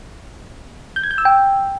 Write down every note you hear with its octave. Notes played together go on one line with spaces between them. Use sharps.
G6
G#6
G6
E6
G5